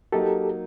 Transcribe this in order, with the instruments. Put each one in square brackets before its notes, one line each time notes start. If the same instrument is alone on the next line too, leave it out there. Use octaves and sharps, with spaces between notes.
[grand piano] F#3 A#3 D#4 [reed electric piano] G4 A4